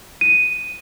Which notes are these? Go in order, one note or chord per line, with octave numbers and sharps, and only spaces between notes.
D#7